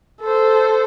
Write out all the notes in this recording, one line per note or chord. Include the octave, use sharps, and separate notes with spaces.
A4 C5